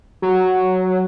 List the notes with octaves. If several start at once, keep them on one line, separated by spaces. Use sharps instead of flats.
F#3